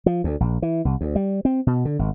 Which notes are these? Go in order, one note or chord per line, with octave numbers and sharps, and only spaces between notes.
F3
D2
A#1
E3
C2
D2
G3
C4
B2
D3
G#1